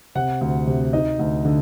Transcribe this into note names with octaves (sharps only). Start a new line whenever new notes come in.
C3 F#5
D2
C3
D#4 D#5
D2
D3